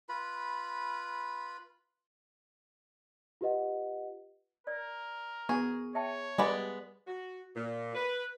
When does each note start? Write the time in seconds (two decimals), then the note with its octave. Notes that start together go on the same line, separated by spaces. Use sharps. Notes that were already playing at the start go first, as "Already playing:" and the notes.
0.09 F4 B4 B5
3.41 F4 G4 B4 D#5 F#5
4.67 A#4 D5
5.49 B3 G#4 C#6
5.95 C#5 E5 G5 A5
6.38 G3 G#3 B3 D5 B5
7.07 F#4
7.55 A#2
7.95 B4